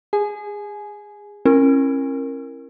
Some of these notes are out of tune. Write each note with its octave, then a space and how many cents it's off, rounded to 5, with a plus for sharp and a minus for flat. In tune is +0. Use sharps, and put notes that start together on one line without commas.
G#4 -25 G#5 +20
C#4 -35 E4 +20 A#4 +0